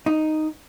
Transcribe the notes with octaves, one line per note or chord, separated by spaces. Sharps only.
D#4